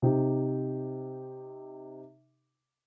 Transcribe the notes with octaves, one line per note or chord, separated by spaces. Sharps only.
C3 D#4 G4